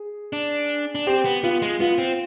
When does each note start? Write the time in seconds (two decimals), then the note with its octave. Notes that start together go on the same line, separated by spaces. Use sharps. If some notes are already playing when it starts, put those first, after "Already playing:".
Already playing: G#4
0.33 D4
0.95 D4
1.07 C4 G4
1.25 B3
1.44 B3 F4
1.62 G#3
1.80 B3 F4
1.98 C4